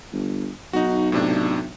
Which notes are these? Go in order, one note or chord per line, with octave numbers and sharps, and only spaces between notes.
G1
B1 D#4 F#4
A2 C3 D4